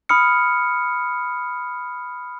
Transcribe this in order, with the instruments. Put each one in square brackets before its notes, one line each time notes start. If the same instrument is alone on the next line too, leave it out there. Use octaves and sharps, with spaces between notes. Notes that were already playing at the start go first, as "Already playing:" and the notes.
[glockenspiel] B5 D#6 F6 C#7